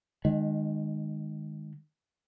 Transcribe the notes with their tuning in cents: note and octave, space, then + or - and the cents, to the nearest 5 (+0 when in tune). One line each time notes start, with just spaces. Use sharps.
D#3 -25 G#3 +0